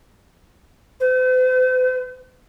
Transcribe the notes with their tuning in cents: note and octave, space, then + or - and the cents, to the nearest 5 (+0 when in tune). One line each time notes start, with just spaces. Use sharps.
C5 -45